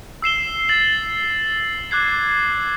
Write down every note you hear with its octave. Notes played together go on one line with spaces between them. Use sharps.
E6 C7 E7 G7
A6 F#7
D6 F#6 G#6 C7